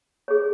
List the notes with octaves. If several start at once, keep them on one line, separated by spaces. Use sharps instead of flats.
G#4 C#5